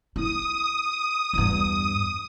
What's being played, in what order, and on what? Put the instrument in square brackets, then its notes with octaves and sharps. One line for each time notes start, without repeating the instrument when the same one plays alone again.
[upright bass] E4 [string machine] D#6
[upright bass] E2 G2